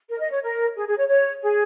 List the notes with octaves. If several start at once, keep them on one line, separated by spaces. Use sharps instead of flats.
A#4
D#5
C#5
A#4
G#4
G#4
C#5
C#5
G#4